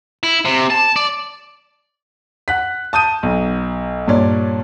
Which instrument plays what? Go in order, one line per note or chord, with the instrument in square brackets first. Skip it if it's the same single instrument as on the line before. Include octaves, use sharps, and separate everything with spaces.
[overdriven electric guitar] E4
C3
A5
D5
[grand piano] F#5 F#6 B6
A5 D#6 G6 D#7
B1
G2 A#2 C#5 D5